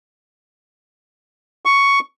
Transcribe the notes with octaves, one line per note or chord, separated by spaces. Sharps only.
C#6